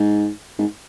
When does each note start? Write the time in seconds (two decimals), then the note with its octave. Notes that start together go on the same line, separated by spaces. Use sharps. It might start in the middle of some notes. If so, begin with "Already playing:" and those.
Already playing: G#2
0.58 G#2